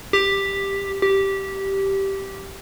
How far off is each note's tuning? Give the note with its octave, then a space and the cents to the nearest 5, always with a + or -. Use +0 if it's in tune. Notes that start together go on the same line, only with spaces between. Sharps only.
G4 +10
G4 -10